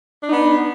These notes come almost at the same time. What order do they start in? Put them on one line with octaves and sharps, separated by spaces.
D4 D#4 B3